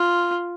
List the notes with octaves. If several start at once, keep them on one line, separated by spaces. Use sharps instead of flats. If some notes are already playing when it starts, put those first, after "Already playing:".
Already playing: F4